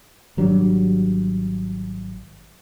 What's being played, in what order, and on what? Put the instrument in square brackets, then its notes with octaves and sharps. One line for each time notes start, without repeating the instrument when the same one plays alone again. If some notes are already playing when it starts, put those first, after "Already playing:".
[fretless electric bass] G#1 F#3 G3 D4